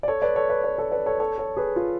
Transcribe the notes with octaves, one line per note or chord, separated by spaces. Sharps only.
D5
A4 C#5
B4 D5
A4 C#5
B4 D5
B4 D5
A4 C#5
B4 D5
A4 C#5
A4 C#5
A4 C#5
G#4 B4
F4